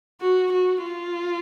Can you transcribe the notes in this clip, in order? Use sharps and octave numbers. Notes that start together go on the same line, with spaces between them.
F#4
F#4
F4